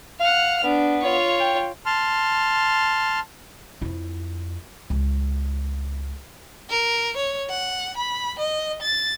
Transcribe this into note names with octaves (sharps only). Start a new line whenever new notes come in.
F5 F#5 F6
B3 D4
F4 C#5
G5
A5 C6 F6
F2 E4
C#2
A#4
C#5
F#5
B5
D#5
A6